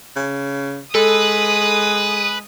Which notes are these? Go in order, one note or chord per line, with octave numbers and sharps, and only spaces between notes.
C#3
G#3 A4 B4 D#6